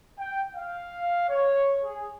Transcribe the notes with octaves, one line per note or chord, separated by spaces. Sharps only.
G5
F5
C#5
G#4